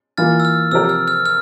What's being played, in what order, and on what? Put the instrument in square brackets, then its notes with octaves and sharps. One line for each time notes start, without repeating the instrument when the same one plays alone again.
[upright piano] E3 A#3 F4 [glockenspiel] F6 A6
[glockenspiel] E6
F6
[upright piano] C3 F3 C4 G4 A#4 [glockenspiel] E6
[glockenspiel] F6
F6
F6